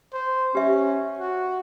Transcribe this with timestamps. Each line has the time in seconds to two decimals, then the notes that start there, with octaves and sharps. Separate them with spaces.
0.13 C5
0.55 C#4 G4 E5
1.19 F#4